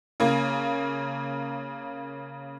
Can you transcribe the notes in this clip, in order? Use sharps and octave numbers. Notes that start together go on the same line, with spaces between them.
C#3 A#3